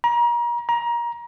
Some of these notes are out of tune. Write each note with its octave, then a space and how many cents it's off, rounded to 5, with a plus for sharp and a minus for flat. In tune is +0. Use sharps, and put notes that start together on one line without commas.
A#5 +35
A#5 +25